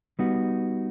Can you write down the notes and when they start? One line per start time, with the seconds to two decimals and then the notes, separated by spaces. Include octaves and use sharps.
0.19 G3 B3 D#4 F#4